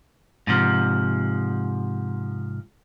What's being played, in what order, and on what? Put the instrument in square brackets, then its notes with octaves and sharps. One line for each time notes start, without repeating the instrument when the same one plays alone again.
[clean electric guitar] G#2 C3 F3